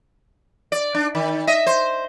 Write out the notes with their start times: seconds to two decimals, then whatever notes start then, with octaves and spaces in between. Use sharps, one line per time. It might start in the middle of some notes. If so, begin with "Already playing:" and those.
0.72 D5
0.94 D4
1.15 D#3
1.47 D#5 E5
1.67 C5